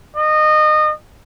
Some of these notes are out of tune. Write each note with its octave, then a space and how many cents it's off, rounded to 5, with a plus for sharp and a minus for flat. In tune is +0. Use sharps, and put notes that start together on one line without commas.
D#5 -25